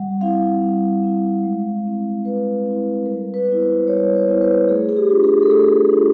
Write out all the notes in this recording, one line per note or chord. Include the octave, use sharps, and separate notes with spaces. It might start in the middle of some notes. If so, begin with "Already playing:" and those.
Already playing: G3 F#5
C4 E4 F5
G3
C4 E4
G#3
C4 E4
G#3 B4
C4 E4
G3 A#4
B4
B3 E4
C5
G3 C#5
C5
B3 E4
B4
A3 G#4
G#4
G4
D4 F4
G#4
A4
A3 G#4
D4 F4